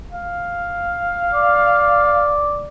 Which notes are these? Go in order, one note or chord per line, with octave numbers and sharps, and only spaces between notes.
F5
D5